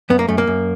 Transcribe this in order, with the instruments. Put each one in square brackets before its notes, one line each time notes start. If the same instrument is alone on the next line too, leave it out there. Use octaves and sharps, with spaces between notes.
[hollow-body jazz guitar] F#2 B3
A#3
F#2 A3
A#3
F#2